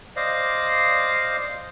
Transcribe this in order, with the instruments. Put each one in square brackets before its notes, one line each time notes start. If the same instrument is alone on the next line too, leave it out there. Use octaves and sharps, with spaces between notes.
[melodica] C5 D5 D#5 F5